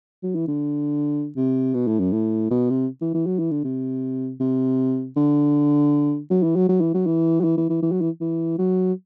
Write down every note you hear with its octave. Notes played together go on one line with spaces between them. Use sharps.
F#3
E3
D3
C3
B2
A2
F#2
A2
B2
C3
E3
E3
F#3
E3
D3
C3
C3
D3
F#3
E3
F#3
F#3
E3
F#3
E3
F#3
E3
E3
E3
E3
F#3
E3
E3
F#3